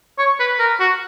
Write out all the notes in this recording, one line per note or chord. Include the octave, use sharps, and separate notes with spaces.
C#5
B4
A#4
F#4